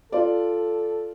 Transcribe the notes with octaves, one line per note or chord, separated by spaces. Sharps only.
F4 A4 D5